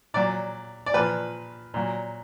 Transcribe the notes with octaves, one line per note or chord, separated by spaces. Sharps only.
A#2 F#3 D5
D5
A#2 F3 B4
A#2 F#3